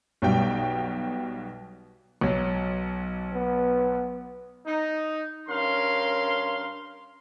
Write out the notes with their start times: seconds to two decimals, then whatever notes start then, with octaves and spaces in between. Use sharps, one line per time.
0.22 B1 B2 G3 G5
2.21 B1 F#3
3.33 B3
4.67 D#4
5.49 G2 C#4 A#4 F5 C6